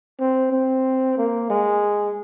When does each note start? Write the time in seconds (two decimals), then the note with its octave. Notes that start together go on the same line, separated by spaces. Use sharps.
0.20 C4
0.52 C4
1.18 A#3
1.50 G#3